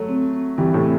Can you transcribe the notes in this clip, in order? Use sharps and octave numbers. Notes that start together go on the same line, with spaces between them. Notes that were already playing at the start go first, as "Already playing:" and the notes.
Already playing: F#3 A3
C4
C4
E3 G3 C4
A2 C3
C4